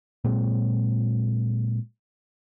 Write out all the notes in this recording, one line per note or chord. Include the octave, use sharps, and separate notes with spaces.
A#2 F#3 G#3 C4